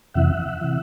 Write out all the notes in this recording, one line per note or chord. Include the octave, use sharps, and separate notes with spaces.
F2 C3 E3 E5 F#5
C3 E3